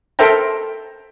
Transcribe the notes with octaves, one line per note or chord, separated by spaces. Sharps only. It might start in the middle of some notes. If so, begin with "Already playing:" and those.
A4 A#4 C5 E5 G5 A#5